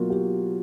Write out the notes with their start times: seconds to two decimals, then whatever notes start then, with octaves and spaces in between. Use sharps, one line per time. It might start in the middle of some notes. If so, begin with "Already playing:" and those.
Already playing: B2 F#3 A#3 F4 F#4
0.10 G4